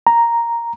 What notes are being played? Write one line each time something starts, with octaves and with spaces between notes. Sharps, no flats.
A#5